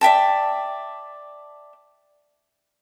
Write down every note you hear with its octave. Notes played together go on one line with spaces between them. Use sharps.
D5 E5 G5 A5